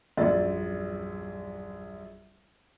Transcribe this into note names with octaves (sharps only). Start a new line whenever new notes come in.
D#1 A#1 F#2 D5 A6